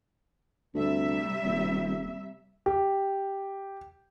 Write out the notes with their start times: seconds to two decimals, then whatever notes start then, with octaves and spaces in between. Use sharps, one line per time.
0.74 D2 C3 G3 E5
1.45 D#1
2.66 G4